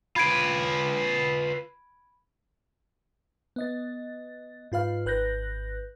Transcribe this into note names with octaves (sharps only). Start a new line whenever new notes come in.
F4 B4 B5 G#6 D7
B3 D#5 A6
G#2 F4 B4 F5
G#1 B4 F#6 G6 A#6